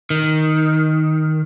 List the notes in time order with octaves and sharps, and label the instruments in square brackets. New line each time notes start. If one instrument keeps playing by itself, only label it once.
[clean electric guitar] D#3